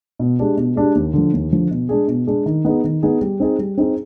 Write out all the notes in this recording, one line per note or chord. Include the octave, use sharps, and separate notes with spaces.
B2
G#3 D4 G4
B2
G#3 D4 G4
D#2
D3 F3
D#2
D3 F3
B2
G#3 D4 G#4
B2
G#3 D4 G#4
D#3
B3 D#4 G#4
D#3
B3 D#4 G#4
G3
C4 D#4 G#4
G3
C4 D#4 G#4